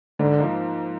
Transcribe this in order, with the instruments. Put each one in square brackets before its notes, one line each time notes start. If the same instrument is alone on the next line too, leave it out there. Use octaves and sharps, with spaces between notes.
[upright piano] G#2 [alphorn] D3
[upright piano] F3 A#3 D#4